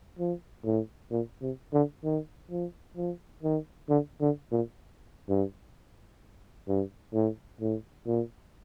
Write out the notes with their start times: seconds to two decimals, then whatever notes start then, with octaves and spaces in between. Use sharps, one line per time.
0.19 F3
0.65 A2
1.11 A#2
1.42 C3
1.73 D3
2.04 D#3
2.51 F3
2.97 F3
3.43 D#3
3.89 D3
4.21 D3
4.52 A#2
5.29 G2
6.68 G2
7.14 A2
7.61 A2
8.07 A#2